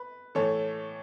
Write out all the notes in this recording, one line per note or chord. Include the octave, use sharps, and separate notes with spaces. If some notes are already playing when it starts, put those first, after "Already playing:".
Already playing: B4
A2 E3 A4 C#5